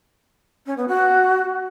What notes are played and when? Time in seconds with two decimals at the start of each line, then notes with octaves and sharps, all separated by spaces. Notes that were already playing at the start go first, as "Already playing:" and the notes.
0.66 C#4
0.77 B3
0.88 F#4